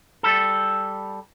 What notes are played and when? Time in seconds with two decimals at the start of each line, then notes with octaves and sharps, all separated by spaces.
0.23 G3 A4